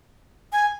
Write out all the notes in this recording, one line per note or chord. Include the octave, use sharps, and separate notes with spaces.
G#5